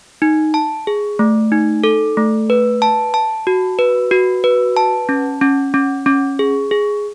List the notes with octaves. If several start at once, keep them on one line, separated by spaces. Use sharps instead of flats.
D#4
A5
G#4
A3
D#4
A4
A3
B4
A5
A5
F#4
B4
F#4
B4
A5
C#4
C#4
C#4
C#4
G#4
G#4